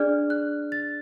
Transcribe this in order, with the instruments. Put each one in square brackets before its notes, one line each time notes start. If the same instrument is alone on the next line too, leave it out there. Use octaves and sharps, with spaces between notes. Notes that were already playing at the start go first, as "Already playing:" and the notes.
Already playing: [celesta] D4 G#4 D5 F6
F#6
A6